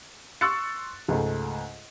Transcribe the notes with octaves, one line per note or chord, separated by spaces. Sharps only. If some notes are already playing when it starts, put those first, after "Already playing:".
C6 C#6 E6 F#6 A6 C#7
C#2 G#2 A3